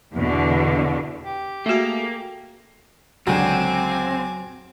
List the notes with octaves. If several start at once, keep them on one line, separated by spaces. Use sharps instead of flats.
E2 B2 D3
G4
A3 A#3 F#4 G#4 A4
C#2 D3 F#3 C4 G#5 D6